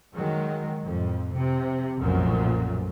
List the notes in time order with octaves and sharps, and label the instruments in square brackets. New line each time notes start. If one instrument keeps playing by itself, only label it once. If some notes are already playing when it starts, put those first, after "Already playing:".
[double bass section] D#3 F#3 G#3
F2 A2
C3
B1 F#2 A#2 F3 F#3 A3